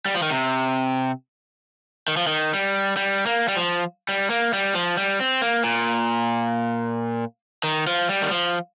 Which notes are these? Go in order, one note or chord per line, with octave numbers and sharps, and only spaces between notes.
G3
F3
D#3
C3
D#3
F3
D#3
G3
G3
A#3
G3
F3
G3
A#3
G3
F3
G3
C4
A#3
A#2
D#3
F3
G3
D#3
F3